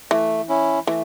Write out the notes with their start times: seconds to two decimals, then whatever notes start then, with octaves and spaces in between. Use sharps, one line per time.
0.11 E3 A3
0.49 C#4 E4
0.87 E3 A3